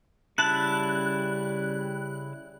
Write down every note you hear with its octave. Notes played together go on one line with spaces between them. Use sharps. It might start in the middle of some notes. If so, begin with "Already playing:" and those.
C#3 G3 E4 A5 F#6